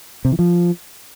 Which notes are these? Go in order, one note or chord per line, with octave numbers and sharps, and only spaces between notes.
C3
E3
F3